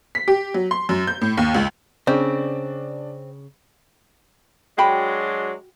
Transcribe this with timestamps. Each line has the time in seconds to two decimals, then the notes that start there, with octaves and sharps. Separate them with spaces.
0.15 B6
0.28 G4
0.54 F#3
0.71 C6
0.89 F#2
1.07 G6
1.21 A2
1.37 D#2
1.54 C#2
2.07 C#3 C4 D4 D5
4.78 F#3 G#3 D4 F#4 G5 B5